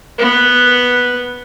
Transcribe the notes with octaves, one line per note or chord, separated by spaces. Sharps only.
B3 B4